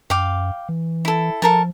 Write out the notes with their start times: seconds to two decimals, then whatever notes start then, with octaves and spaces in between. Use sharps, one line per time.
0.10 F#2 F5 G5 D6
0.69 E3
1.05 E4 A4
1.42 F3 A4 A#4 A5